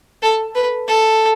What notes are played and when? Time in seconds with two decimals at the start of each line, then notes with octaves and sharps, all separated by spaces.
0.22 A4
0.55 B4
0.88 A4